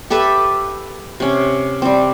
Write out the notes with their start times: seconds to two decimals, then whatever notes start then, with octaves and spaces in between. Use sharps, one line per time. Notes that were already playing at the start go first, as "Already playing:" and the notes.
0.10 G4 A4 B4 E5
1.20 C3 C#4
1.82 G3 C4